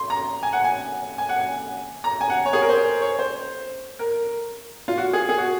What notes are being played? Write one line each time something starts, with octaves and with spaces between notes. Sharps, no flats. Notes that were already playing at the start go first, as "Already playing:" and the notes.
Already playing: C6
A#5
G#5
F#5
G#5
G#5
F#5
G#5
A#5
G#5
F#5
C#5
G#4
A#4
C5
C#5
C5
A#4
F4
F#4
G#4
G#4
F#4